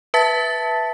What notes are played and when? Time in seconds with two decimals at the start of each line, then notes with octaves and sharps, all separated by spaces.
0.14 B4 E5 A5 A6 B6